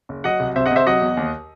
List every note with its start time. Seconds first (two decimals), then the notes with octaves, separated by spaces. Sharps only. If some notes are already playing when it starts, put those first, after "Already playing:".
0.09 F#1
0.24 F#3 D#5 F#5
0.40 C2
0.56 C3 C5 E5
0.66 D#5 F#5
0.71 C3 C5 E5
0.87 F#3 D#5 F#5
1.01 E2
1.17 D#2